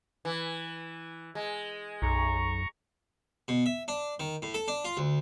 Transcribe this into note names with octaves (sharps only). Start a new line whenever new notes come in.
E3
G#3
B1 F#2 A#5 C#6
B2
E5
D4
D#3
A2
A4
D4
F4
D2